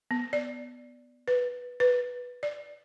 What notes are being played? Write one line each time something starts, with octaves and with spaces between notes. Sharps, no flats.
B3
D5
B4
B4
D5